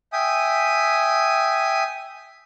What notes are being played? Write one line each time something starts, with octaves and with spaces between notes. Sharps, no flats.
E5 G5 G#5 D#6